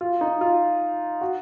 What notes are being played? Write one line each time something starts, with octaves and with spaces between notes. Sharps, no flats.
F4
D#4
F4
F#4